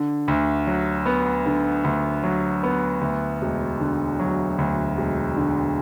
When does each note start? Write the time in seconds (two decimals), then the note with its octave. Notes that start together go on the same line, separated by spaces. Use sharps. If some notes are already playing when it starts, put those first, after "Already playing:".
Already playing: D3
0.28 D2
0.67 F#3
1.06 B3
1.46 D3
1.84 D2
2.23 F#3
2.63 B3
3.01 D2
3.41 E1
3.80 D3
4.20 F#3
4.58 D2
4.97 E1
5.36 D3